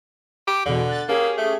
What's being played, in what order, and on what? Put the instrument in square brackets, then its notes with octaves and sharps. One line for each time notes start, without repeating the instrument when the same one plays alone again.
[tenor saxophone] G4
[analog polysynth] E2 B2 [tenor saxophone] D3
[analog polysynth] F#6 A6
[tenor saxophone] A#3 [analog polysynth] C#4 G4 G#4
[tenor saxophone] A3